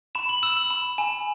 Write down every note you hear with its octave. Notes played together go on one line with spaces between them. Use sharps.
B5 E7
F#7
E6 E7
F#7
B5 E7
G#5 E7